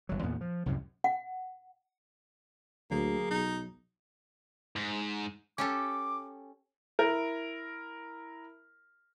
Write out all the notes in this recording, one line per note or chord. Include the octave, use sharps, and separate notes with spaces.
G1 F#3
E2 A#2 B3
F3
C2 F#2 A2 C3
F#5
D2 F#3 A#3 G#4
B1 D#4
G#2
C#4 G4 A4 D6
E4 A#4